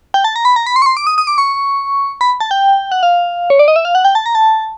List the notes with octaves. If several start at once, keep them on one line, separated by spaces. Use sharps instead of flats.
G5
A5
A#5
B5
A#5
B5
C6
C#6
C6
D6
D#6
D#6
D6
C#6
B5
A5
G5
F#5
F5
C#5
D5
D#5
E5
F5
F#5
G5
A5
A#5
A5